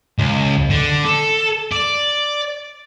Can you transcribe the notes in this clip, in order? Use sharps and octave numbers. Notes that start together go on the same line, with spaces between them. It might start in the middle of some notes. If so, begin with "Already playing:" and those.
C#2
D3
A4
D5